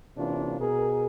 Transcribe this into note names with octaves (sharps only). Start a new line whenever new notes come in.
C3 E3 A#3 C#4 D4 F4
B2 G#4 A#4